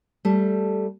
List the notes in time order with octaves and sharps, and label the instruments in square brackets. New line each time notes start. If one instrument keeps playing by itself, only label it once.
[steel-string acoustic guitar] G3 A3